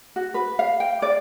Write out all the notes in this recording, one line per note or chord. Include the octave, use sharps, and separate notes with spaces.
F#4
B4
F5
G5
D5